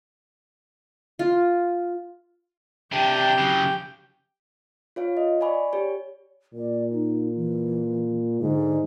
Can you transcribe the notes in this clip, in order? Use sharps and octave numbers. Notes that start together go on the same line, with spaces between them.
F4
C3 D4 G4 G5
C#3 F#3
F4 C#5 F5
D#5
D5 G#5 B5 C#6
G4 C#5
A#2 D5
D#4
E3
G#2 D3